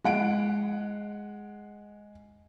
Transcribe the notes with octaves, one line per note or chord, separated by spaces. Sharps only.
G#3 F#5 D7